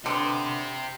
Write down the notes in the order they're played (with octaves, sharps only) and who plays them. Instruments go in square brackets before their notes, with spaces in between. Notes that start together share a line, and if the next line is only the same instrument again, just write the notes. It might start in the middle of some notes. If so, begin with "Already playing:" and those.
[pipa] D3 B3 [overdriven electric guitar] G4 C5